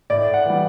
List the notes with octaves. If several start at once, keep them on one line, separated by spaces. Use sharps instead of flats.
A2 D5
F#5
E3 G3